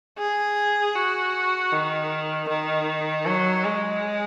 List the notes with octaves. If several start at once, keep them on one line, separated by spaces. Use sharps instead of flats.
G#4
F#4
D#3
D#3
F#3
G#3